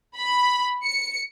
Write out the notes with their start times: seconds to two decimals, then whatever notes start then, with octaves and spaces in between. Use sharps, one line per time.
0.16 B5
0.84 C#7